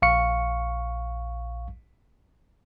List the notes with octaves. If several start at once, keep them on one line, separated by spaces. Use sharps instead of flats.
A#1 F5 C#6 C#7